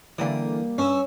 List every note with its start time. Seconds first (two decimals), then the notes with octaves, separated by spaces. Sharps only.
0.18 D3 E3 G3 A#3 D5 D#6
0.78 G2 C#4 E6